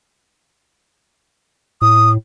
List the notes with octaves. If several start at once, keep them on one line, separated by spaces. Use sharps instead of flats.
A2 D#6